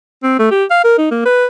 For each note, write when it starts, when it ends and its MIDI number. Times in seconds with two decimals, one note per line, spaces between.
0.23 0.37 60
0.39 0.48 57
0.51 0.64 67
0.71 0.81 77
0.85 0.94 70
0.98 1.09 63
1.11 1.20 58
1.25 1.46 71